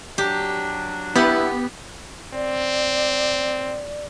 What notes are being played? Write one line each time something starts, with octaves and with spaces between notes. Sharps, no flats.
F#3 D4 G4
B3 E4 G4
C4 D5